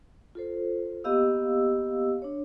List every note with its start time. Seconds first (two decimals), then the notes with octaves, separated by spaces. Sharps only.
0.35 F4 A4 C5
1.04 A#3 B3 G4 D#5 F5 E6
2.22 D4 C#5